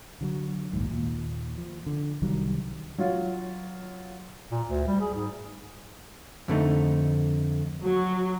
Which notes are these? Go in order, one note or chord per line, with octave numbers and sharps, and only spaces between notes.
D3 F3 F#3
A#1 D#2 G#2
D#2 A#2
F3
D3
C2 D#3 F#3 G3
F#3 F4
A#2
D2
G3
G#4
G#2
F2 D3 A3 D#4
F#3